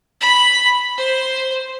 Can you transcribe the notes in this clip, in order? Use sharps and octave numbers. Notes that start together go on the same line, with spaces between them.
B5
C5